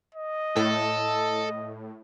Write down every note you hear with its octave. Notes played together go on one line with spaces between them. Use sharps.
D#5
A2 A4